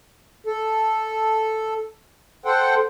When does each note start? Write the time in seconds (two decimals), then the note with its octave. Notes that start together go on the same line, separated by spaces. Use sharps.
0.47 A4
2.45 A4 C5 F#5 G5